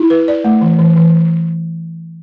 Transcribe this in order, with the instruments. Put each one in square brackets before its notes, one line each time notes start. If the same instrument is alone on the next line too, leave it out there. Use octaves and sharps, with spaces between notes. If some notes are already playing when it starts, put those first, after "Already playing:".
Already playing: [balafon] E4
B4
D5
A3
E3
E3
E3